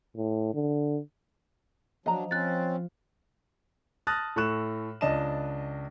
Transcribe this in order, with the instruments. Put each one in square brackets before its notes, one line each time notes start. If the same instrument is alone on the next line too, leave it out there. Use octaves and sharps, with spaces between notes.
[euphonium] A2
D3
[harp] F3 [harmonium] F#3 D4 [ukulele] D#5 A#5
[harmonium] C4 C#4 [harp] F4 [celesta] F#6 A6
[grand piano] A5 D#6 F6 F#6 A6 A#6
A2 A4 C#6 F#6 E7
C#2 D4 D#5 A5 E7